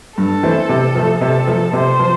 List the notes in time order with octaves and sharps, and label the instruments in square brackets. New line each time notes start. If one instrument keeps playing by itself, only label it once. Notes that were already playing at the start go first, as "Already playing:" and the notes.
[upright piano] G2 [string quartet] A4
[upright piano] E3 A3 C4
C3
F3 A3
[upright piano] C3 [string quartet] A4
[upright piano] F3 A3
[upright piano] C3 [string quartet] C5
[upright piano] F3